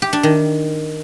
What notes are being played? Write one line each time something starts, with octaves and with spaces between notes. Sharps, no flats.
G4
D4
D#3